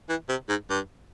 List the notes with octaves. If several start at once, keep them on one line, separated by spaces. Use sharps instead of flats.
E3
C3
G#2
G2